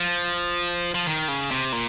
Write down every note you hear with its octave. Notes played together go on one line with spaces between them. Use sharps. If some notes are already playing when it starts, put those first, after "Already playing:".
Already playing: F3
F3
D#3
C#3
C3
A#2